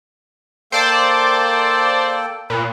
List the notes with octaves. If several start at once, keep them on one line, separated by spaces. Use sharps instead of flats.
A#3 A4 C5 D5 G5 A5
A#2 B4